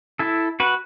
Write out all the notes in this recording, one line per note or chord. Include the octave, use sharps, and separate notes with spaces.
E4 A4
F#4 B4